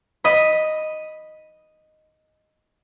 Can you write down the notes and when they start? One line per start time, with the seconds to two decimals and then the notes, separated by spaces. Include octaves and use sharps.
0.24 D#5 B5